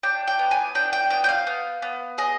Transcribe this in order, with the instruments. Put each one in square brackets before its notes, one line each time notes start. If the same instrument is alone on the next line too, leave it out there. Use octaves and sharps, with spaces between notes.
[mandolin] D4 G5
G5
B3
G#5
D4 G5
G5
B3 G5
G5
F5
B3
B3
G#4 D#5